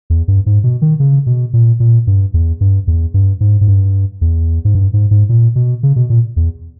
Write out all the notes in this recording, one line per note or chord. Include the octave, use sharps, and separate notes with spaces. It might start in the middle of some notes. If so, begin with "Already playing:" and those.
E2
G2
G#2
B2
D#3
C#3
B2
A#2
A#2
G2
E2
G2
E2
G2
G#2
G#2
G2
E2
G#2
G2
G#2
G#2
A#2
B2
C#3
B2
A#2
E2